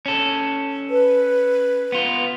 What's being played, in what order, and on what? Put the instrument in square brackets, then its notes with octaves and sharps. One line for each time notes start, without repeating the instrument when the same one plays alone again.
[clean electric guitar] C#4 A4
[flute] B4
[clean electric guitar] B3 F4